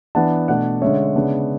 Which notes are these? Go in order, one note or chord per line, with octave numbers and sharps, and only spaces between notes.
E3 B3 D4 F#5 A5
B2 A3 D4 D5 F#5
D3 G#3 C#4 C#5 E5
C#3 G#3 B3 D4